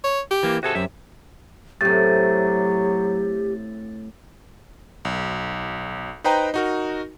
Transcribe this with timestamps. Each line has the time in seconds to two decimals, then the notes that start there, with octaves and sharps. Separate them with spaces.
0.04 C#5
0.31 G4
0.43 E3 A#3
0.63 C3 F#4 G#4 A4
0.75 F#2 C3 E5
1.81 A2 C3 F#3 G4 A6
5.05 B1
6.24 D#4 B4 C5 D#5 G5 A#5
6.54 D#4 F#4 A#4